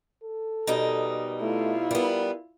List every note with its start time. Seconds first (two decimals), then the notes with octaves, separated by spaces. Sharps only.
0.23 A4
0.67 B2 G3 D#4 A#4
1.41 A3 E4 F4
1.91 G3 B3 A#4